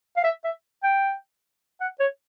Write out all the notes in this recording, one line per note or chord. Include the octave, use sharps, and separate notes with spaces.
F5
E5
E5
G5
F#5
C#5